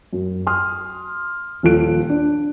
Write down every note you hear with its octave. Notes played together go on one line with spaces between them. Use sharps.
F#2
C6 D#6 F6
D#1 F3 F4 A4 F#6 D7
D4